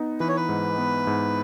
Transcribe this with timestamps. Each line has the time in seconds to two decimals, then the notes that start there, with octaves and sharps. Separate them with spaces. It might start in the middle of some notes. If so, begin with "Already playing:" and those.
Already playing: B3 D#4
0.20 E3 B4
0.28 C#5
0.37 B4
0.49 G#2
0.78 B3
1.07 G#2